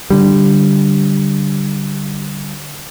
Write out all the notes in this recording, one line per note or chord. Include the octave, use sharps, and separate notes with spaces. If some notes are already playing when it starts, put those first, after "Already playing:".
D3 G3